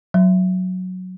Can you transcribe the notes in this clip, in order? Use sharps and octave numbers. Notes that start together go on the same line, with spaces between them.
F#3